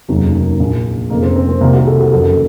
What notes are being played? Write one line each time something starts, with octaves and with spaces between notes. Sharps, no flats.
F1 D#2 C#3 F#3
A#1 A#2
F1 F2 C#3 A#3
C4
C4
C4
C2 C3 D#3 A#3
F#4
A4
F#4
F#1 F2 D#3 A4